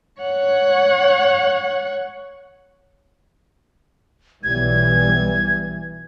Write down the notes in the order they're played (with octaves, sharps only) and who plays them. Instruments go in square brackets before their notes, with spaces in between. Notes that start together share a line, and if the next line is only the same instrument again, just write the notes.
[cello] C#5 F#5
[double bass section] B1 E3 G3 [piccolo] G#6